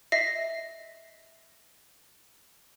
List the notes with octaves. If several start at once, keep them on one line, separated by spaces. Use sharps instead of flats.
D#5 E5 A#6 C7